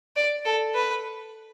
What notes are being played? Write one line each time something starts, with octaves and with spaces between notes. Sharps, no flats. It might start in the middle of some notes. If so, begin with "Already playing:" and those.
D5
A4
B4